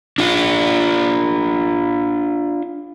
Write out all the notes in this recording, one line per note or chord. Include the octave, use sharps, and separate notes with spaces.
D4 F4